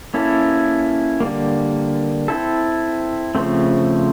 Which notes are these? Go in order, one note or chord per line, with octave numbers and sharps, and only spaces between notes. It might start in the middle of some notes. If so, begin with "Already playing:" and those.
A#3 C#4 E4 A4
D3 G3 A#3
C4 E4 A4
C#3 F3 A3 C4